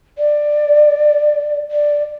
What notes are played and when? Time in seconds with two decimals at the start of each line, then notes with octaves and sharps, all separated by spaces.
0.18 D5
1.71 D5